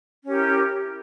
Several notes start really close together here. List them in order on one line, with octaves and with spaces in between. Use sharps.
C#4 G4 A#4 E4